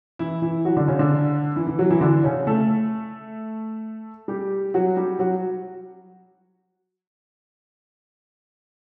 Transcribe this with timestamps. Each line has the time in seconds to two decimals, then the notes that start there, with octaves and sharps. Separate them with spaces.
0.19 E3 E4
0.42 E3 E4
0.65 F#3 F#4
0.77 D3 D4
0.87 C#3 C#4
0.99 D3 D4
1.56 E3 E4
1.67 E3 E4
1.79 F#3 F#4
1.90 E3 E4
2.01 D3 D4
2.24 C#3 C#4
2.47 A3 A4
4.28 G3 G4
4.74 F#3 F#4
4.96 G3 G4
5.19 F#3 F#4